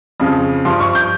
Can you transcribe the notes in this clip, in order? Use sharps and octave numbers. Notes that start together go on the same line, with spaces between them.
F2 C#3 F3
G2 F3 C6
C#6
G6